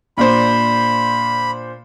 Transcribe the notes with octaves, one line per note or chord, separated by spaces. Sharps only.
A#2 D4 C5 B5